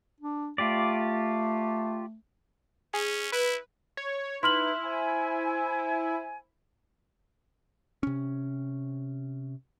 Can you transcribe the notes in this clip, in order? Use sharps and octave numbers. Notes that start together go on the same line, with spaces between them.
D4
A3 F4 G4 D5
C#4 G#4
E4 B4
C#5
D#4 E4 B4 C6 F6 F#7
C5 E5 G#5
C3 C#4